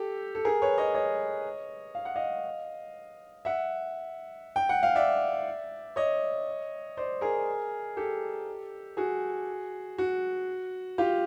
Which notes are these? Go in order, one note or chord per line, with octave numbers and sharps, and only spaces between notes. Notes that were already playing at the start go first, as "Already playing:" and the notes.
Already playing: G4 A4
A4
G#4 A#4
B4 C#5
C#5 D#5
C#5 D#5
F5
F#5
D#5 F5
E5 F#5
G5
F#5
F5
D5 E5
C#5 D#5
C5 D5
G#4 A#4
G4 A4
F#4 G#4
F#4
F4 G4